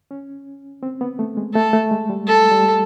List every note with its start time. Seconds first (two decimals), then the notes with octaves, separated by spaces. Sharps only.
0.11 C#4
0.83 C4
1.01 B3
1.19 A3
1.37 G#3
1.55 A3 A4
1.73 A3
1.91 G#3
2.10 G3
2.27 A4
2.52 G3